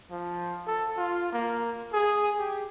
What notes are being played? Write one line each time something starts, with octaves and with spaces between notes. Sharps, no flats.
F3
A4
F4
A#3
G#4
G4